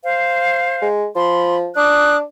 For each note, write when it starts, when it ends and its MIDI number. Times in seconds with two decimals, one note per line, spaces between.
0.04 0.88 72
0.04 0.88 77
0.82 1.06 56
1.15 1.70 53
1.15 1.56 83
1.15 1.56 84
1.76 2.22 62
1.76 2.16 86
1.76 2.16 87
1.76 2.16 90